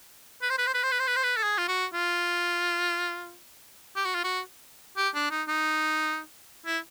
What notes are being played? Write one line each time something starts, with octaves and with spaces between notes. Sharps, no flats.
B4
C5
B4
C5
B4
C5
B4
C5
B4
C5
B4
A4
G#4
F4
F#4
F4
G4
F#4
F4
F#4
G4
D4
D#4
D#4
E4